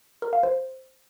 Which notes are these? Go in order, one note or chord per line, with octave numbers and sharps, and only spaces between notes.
A#4
F5
C5